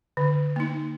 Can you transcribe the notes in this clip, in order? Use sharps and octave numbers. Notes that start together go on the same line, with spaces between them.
D3
A#3 D#4